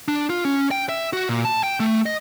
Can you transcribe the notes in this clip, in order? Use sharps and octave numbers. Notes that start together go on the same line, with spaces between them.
D4
F4
C#4
G5
E5
F#4
A#2
A5
G5
A3
D#5